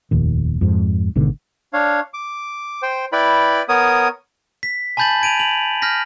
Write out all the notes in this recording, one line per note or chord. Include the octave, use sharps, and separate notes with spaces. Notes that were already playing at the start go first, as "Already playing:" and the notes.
F1 D#2 A#2
F2 G#2
G#1 G#2 B2 D3
D4 C#5 F5
D6
C5 G5
E4 B4 D5 G5 B5
B3 A#4 C#5 D#6
B6
G#5 A5 B5 G6 A6 F#7
A5 G#6 D7 D#7 F7
F7 F#7
F6 G6 A#6 B6